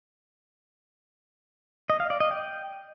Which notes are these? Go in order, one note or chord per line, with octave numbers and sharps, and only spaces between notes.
D#5
F5
D5
D#5
G5